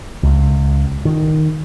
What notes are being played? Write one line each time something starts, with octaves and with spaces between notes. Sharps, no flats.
C#2
D#3